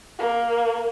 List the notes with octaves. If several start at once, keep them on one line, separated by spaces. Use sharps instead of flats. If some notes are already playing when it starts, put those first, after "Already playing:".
A#3